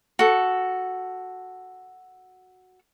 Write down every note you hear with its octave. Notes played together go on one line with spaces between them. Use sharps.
F#4 A4